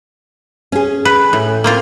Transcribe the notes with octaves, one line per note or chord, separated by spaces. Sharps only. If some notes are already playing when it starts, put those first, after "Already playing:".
C#4 G#4
B4
A2
A#3 C4 F4